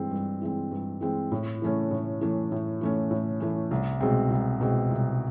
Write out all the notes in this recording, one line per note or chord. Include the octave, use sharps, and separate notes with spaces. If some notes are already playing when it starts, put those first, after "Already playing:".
Already playing: G2 E3 G#3 C4
G2
E3 G#3 C4
G2
E3 G#3 C4
A2
E3 A3 C#4
A2
E3 A3 C#4
A2
E3 A3 C#4
A2
E3 A3 C#4
C2
B2 G#3 C4
C2
B2 G#3 C4
C2